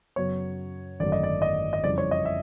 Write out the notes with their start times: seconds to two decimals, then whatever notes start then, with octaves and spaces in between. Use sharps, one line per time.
0.16 F#2 C#3 F#3 B3 C#5
1.00 G#1 F#2 D3 F#3 A3 D5
1.12 D#5
1.23 D5
1.42 D#5
1.73 D#5
1.83 F2 C#3 E3 G3 D5
1.98 C#5
2.11 D#5
2.25 E5